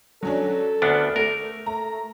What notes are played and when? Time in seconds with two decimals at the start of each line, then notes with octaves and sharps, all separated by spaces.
0.23 F#3 C#4 D4 A4
0.82 D2 B3 D4 F6
1.16 A3 A#4
1.66 A3 A#5